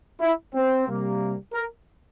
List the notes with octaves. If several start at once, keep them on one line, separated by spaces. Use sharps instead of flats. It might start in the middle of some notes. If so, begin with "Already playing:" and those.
E4
C4
C3 G3 A#3
A#4